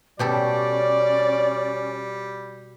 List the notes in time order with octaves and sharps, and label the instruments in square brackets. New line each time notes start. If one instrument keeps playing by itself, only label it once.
[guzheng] B2 G4 A4 [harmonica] G3 [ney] C#4 [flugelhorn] D5